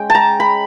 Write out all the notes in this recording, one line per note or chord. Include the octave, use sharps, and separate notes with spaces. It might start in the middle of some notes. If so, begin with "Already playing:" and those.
Already playing: G#3 C#4 G5
A5
A#5
B5